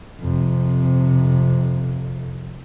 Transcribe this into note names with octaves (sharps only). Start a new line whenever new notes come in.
F2 C3